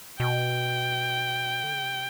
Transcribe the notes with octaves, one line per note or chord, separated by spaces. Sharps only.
B2 G5
D3
C#3
C3